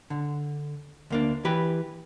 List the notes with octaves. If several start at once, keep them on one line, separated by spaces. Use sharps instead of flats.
D3
D2 A#3 D4
E3 G4 B4